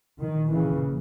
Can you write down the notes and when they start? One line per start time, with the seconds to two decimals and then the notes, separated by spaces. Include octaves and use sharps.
0.22 A#1 A#2 D#3
0.50 C#3 E3